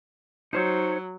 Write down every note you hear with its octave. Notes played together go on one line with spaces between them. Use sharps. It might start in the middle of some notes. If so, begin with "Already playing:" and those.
F#3 D#4 C5 C#5